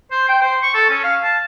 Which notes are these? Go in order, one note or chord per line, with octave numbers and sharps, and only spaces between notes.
C5
G5
C5
C#6
A4
C#4
F5
A5